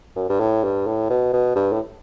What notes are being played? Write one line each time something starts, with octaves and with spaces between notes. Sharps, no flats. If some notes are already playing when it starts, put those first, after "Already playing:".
F#2
G2
A2
G2
A2
B2
B2
G2
A2